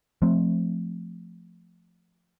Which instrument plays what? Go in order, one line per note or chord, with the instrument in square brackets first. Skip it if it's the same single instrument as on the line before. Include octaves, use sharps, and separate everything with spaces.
[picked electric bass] F3 A3 C4